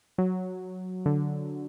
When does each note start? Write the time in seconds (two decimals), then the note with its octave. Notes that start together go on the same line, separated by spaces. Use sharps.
0.18 F#3
1.06 D3